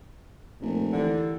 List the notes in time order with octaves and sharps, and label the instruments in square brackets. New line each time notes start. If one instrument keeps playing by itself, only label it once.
[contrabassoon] F1 [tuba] A#2
[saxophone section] D#2 D3 [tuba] E3